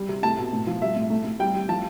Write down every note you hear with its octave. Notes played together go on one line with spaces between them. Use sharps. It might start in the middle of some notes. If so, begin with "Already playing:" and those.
Already playing: G3
C3
A3 A5
B2
A2
F3
G3 E5
A2
A3
A3
G3 G5
G3
F3 A5